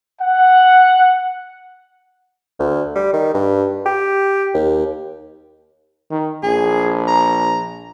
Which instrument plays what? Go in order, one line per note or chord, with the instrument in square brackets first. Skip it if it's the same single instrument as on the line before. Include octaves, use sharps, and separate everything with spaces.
[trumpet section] F#5
[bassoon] D2
G3
D#3
G2
G4
D#2
[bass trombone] D#3
[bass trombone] A#1 [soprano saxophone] G#4
[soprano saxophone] A#5